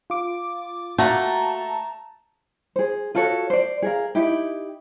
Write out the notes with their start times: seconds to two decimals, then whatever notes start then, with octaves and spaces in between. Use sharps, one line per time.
0.10 F4 D6
0.98 A3 A#3 F#4 A5 A#5
2.76 G#4 C5
3.15 F4 F#4 A4 C#5
3.50 C5 D5
3.82 G#4 A#4 F5
4.15 D#4 E4 G4